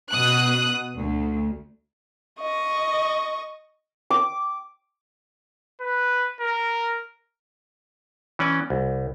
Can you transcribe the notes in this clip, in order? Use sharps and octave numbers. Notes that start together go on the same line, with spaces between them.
B2 D#6 F#6
D2
D#5 C#6
D6
B4
A#4
E3 C#4 D5
C2